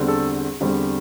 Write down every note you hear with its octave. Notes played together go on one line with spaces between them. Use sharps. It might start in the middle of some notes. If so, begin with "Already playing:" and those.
Already playing: E2 D3 G3 C4
A4
E2 D3 G3 C4